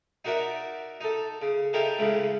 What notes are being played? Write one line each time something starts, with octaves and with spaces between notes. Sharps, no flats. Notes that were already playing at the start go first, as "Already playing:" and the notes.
D#4 F#4 A#4 D5 E5
D#4 A4
C#3
E4 G4 A4 A#4 D#5 F5
C#2 A2 C#3